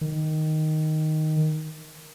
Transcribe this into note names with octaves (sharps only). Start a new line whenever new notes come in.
D#3